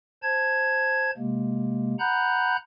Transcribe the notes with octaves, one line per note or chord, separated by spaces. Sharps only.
C5 A5 G#6
C3 G#3 A#3
F#5 A#5 B5 F#6 G6